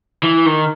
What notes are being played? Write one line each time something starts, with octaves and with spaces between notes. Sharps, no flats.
E3
D#3